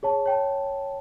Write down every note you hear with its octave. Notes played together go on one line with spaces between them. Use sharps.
G#4 C#5 A5
C#5 G5 A5